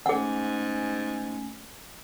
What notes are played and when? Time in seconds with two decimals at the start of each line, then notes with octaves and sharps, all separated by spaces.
0.06 G#2 A3 C#4 G#4 F#5 G#5